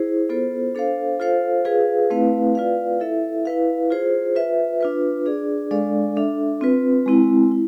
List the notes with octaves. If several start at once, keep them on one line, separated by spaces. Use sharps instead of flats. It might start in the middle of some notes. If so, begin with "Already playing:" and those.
Already playing: E4 G#4 C5
B3 F4 A4 C5
D4 A4 C5 F5
F4 A4 C5 F5
F4 G#4 B4 F5
A3 C4 E4 B4 F5
F4 B4 D5 F5
E4 A4 E5
E4 B4 F5
F4 G#4 C5
F4 B4 E5
D4 F4 B4
D4 G#4 D5
G#3 D4 A4 D5 F5
D4 A4 E5
C4 F4 B4
G#3 C4 E4
E4